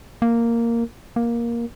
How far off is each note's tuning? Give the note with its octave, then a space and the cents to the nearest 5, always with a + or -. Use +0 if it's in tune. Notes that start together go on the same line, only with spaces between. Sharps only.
A#3 -5
A#3 +10